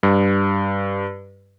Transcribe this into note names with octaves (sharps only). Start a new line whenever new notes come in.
G2